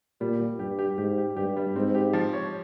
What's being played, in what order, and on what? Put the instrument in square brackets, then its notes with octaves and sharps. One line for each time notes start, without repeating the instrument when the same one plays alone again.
[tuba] A#2 [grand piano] G3
[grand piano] G3
[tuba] G2 [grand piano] G4
[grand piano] G4
[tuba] G#2 [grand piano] G4
[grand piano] G4
[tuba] G2 [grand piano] G4
[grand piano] G3
[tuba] G#2 [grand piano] C4
[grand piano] G4
F3
C#5